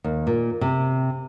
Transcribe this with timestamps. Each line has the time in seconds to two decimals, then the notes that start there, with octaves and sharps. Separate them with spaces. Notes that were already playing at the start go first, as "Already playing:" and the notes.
0.04 D#2
0.27 A#2
0.61 C3